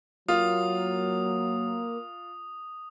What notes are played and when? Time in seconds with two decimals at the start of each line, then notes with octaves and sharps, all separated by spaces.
0.28 F#3 A#3 F4 D#6